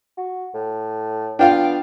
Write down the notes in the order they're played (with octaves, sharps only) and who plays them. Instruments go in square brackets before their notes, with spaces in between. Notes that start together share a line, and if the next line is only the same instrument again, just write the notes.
[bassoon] F#4
A2
[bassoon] B3 [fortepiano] D4 F4 F5 [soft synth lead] G5